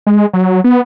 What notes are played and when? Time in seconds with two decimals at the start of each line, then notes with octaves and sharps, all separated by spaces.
0.07 G#3
0.33 F#3
0.64 B3